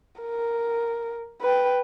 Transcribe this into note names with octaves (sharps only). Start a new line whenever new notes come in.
A#4
B4 G5